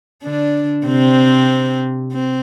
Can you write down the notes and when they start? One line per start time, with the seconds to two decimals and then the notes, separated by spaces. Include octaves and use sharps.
0.23 D3 D4
0.86 C3 C4
2.12 C4